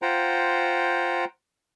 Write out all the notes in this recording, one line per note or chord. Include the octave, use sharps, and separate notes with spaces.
F4 C5 F#5 G5 A#5